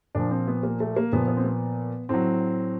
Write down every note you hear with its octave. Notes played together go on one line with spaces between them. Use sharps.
A#2 F3 D4
C4
B3
A#3
A3
A#3
A#2 F3 B3
B3
C4
B3
A2 F#3 C4